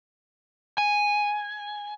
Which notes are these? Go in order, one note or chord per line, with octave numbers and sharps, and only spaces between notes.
G#5